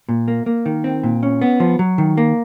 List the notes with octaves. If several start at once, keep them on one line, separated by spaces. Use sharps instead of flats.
A#2
A#3
A#3
D#3
C4
A#2
C#4
B3
F3
F#3
D#3
A#3